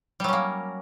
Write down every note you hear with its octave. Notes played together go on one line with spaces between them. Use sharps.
F#3 G3 A#3 C#4